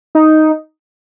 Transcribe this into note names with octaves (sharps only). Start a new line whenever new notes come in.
D#4